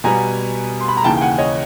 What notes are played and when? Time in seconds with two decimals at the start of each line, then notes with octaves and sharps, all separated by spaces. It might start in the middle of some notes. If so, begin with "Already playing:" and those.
0.04 B2 G3 B3 G#5 A#5
0.81 C6
0.88 B5
0.97 A#5
1.04 D#2 C#3 E3 G5 A5
1.17 G5
1.21 F#5 G#5
1.38 C#5 D#5